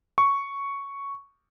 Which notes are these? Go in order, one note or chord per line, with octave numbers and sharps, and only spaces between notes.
C#6